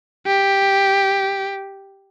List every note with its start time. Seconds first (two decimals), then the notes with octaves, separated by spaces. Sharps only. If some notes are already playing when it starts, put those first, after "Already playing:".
0.26 G4